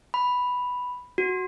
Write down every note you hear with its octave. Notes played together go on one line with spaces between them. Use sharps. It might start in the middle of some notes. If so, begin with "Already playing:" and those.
B5
F#4